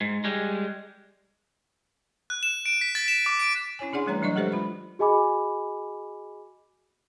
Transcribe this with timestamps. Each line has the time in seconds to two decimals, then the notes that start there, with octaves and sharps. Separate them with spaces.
0.01 G#2
0.24 G3 G#3
2.30 F#6
2.43 E7
2.66 D7
2.81 B6
2.95 A6
3.08 E7
3.26 D6
3.40 D7
3.79 C#4 E4 C#5 G#5
3.93 D4 G#4 D5 F#5 C6
4.06 E3 G3 A3 B4 C#5 A#5
4.22 F#3 D4 D5 D#5 C#6
4.35 G#3 G4 A4 B4 C5 E5
4.52 F4 B5
4.99 F#4 G#4 D#5 G#5 B5 D6